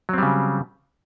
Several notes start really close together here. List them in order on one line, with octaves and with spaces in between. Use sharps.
F#3 C4 G3 C#3